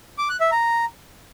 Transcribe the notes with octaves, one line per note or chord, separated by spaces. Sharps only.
D6
F#6
E5
A#5